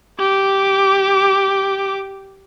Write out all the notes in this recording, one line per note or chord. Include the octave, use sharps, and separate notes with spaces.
G4 D6